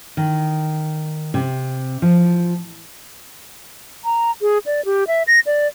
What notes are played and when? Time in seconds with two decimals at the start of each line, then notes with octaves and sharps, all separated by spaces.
0.17 D#3
1.34 C3
2.02 F3
4.05 A#5
4.42 G#4
4.66 D5
4.85 G4
5.07 E5
5.27 A#6
5.46 D5